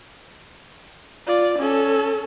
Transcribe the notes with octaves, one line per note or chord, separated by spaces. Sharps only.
F4 D5
C#4 A4